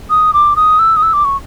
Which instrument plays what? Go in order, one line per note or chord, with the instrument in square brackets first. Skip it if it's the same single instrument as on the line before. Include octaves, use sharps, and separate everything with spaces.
[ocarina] D#6
D6
D#6
E6
D#6
E6
D6
C#6